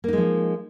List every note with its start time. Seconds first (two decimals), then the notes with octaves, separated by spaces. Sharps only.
0.04 A#3
0.08 D#4
0.13 G#3
0.18 F3